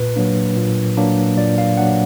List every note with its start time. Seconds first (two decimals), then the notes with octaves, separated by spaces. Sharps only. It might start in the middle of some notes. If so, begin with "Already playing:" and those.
Already playing: A#2 B4
0.16 F#3 A#3 D4
0.57 A#2
0.97 F#3 A#3 D4
1.37 A#2 D5
1.58 F5
1.77 F#3 A#3 D4 F#5